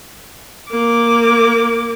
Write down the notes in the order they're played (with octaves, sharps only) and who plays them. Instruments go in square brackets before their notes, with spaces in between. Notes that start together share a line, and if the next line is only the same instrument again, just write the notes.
[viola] A#3 D6